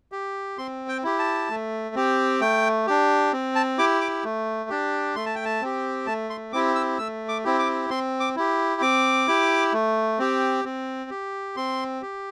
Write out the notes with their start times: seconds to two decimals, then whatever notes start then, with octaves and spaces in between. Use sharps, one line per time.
0.12 G4
0.58 C4 C6
0.88 G5
1.04 E4 G4
1.19 A5
1.49 A3
1.95 C4 G4
2.41 A3 G5
2.87 D4 G4
3.33 C4
3.55 A5
3.78 E4 G4 D6
4.01 D6
4.24 A3
4.70 D4 G4
5.16 A3 C6
5.26 A5
5.35 G5
5.45 A5
5.61 C4 G4
6.07 A3 A5
6.30 C6
6.53 C4 E4 G4 D6
6.75 E6
6.99 A3 E6
7.29 D6
7.44 C4 E4 G4
7.59 D6
7.90 C4 C6
8.20 D6
8.36 E4 G4
8.81 C4 D6
9.28 E4 G4
9.73 A3
10.19 C4 G4
10.64 C4
11.10 G4
11.56 C4 C6
12.02 G4